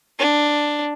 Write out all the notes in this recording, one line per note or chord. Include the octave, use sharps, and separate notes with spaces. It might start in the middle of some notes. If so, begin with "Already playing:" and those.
D4